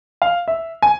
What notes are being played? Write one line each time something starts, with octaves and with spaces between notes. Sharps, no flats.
F5
E5
G#5